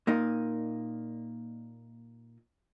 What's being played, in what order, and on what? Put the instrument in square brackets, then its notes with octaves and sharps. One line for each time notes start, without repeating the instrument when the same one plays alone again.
[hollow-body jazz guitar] A#2 A#3 D#4